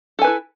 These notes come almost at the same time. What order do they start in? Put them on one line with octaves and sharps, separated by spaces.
A4 G#5 B4 E4